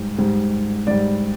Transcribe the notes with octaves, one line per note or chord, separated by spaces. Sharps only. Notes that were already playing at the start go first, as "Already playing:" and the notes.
Already playing: G#2 G3
G#2 G3
G#2 G3 D5